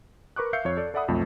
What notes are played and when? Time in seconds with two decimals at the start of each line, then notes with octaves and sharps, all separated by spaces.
0.36 A#4 B4 C#6 D6 F#6
0.53 E5 F5 E6 G6 C7 C#7
0.65 F2 C#5
0.77 A4 D5
0.94 A4 D5 E5 F#5 B5 D#6
1.08 B1 F2 F3 A3